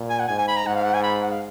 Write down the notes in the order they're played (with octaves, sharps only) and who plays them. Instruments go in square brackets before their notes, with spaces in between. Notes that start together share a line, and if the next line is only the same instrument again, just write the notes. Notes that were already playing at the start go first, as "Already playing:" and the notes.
Already playing: [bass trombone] A#2
[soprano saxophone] G#5
F#5
[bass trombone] G#2 [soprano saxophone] G#5
[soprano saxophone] G#5
B5
A#5
[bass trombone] G#2 [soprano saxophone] F#5
[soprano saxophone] F5
F#5
G#5
B5
F#5
F5